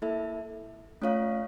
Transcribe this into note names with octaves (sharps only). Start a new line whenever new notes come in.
A#3 E4 A4 E5
A3 C#4 F4 C#5 F5